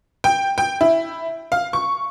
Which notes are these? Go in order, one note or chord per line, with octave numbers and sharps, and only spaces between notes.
G5
G5
E4
F5
C#6